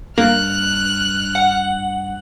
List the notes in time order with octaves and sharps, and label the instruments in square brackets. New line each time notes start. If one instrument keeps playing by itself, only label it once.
[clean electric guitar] G2 [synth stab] A#3 [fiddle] F6 F#6
[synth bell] F#5